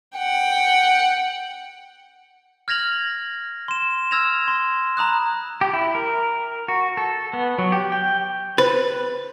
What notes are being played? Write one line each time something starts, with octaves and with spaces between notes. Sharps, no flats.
F#5 G5
F6 G#6 A#6 F7 F#7
C6 E7
E6 F6 G#6 A#6 E7 F7
C6
A#5 B5 D#6 F#6
G4
E4
A#4
F#4
A4
B3
F#3
G4
G5
B4 C5